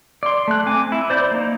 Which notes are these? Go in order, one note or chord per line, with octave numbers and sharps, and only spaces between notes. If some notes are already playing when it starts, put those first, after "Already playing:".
D5 C6
A3 F#6
C4 G#5 D6
E4
C5 D5 B5 G6
A#3 D#4